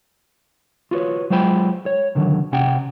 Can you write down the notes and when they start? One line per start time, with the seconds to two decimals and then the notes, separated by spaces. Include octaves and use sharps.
0.91 F4 F#4 B4 C#5
1.30 F#3 G#3 F4 C5 G5 B5
1.86 C#5
2.15 C#2 D3 D#3 F3 F#3
2.52 C3 C#4 F#5 G5